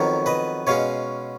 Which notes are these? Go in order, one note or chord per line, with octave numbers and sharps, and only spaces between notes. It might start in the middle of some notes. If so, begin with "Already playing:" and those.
Already playing: F2 D#3 F#3 B3 A#4 C#5
B4 D#5
B2 G#3 C#4 C#5 F5